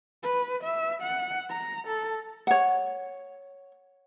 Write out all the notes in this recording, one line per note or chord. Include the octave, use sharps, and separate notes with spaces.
B4
E5
F#5
A#5
A4
C#5 F#5